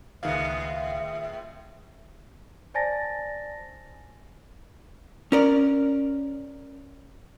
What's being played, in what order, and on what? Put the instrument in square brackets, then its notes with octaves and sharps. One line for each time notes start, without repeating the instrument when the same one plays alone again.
[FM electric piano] C#2 D#3 F5 [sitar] A2 G#3 B3 [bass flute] E5
[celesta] C5 D5 G#5 A5 A6 A#6
[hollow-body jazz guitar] C#4 A#4 D5